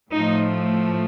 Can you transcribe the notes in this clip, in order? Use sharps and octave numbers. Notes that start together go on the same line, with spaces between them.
A2 F3 A3 D#4